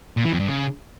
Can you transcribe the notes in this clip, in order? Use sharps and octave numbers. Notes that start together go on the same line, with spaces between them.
A#2
E3
F2
G2
C#3